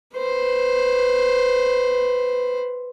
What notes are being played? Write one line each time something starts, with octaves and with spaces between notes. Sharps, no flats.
B4 C5